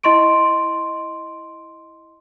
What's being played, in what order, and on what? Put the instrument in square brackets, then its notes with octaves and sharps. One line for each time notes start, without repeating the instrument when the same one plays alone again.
[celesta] E4 D#5 C6 C#6 D7